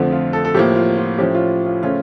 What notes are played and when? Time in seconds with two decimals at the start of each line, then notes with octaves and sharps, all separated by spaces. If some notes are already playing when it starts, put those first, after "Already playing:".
Already playing: F2 D3 F3 A3
0.12 F4
0.33 A4
0.45 A4
0.54 A2 G4
0.57 F3 A#3
0.76 F4
0.97 F4
1.18 A2 F3 C#4 G4
1.35 F4
1.66 F4
1.83 C#3 F3 A3 C#4 F4